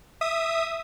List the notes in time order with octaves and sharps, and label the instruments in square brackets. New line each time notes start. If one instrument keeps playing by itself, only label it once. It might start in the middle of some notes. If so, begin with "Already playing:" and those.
[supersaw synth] E5 D#6